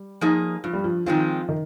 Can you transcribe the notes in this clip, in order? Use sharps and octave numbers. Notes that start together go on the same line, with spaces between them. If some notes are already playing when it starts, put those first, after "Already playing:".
Already playing: G3
F3 A#3 D#4 G#4
G2 F3
G3
F3
D#3 F3 G#3 C4 F4
D#3